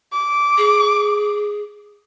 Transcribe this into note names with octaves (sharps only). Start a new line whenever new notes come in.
D6
G#4